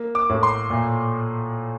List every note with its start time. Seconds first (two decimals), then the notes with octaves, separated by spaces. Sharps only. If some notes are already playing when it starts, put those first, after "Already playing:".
Already playing: A#3
0.15 D6
0.29 A2
0.43 C6
0.70 A#2